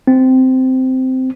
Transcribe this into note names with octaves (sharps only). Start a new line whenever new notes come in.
C4